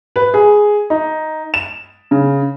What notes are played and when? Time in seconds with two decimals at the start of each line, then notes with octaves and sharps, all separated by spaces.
0.16 B4
0.34 G#4
0.90 D#4
1.54 E7
2.11 C#3